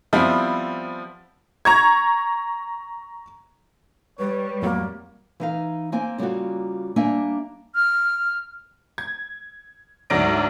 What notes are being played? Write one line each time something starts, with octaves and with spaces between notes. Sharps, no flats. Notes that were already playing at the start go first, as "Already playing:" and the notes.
F3 G3 B3 C4 E4
A#5 C#6 G#6
G3 B4 C#5
F2 A2 F#3 A#3
E3 D#4 F5
A#3 C4 G#5
C#3 G3 A#3 F4 F#4
G3 A#3 D4 E5 G#5
F6
G#6
D2 G#2 F#3 D5 A#6 D7